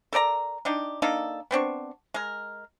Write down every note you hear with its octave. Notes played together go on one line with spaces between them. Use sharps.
A4 A#4 D5 A#5
D4 D#4 G4
A#3 D4 D#4 A4
B3 C4 D4 C#6
G#3 A#4